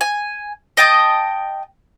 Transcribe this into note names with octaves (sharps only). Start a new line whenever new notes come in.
G#5
D#5 G5 A5 D#6